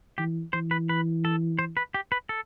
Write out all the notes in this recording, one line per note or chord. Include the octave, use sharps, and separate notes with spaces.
E3 G4
E3 C5
B4
B4
A4
C5
B4
G4
B4
A4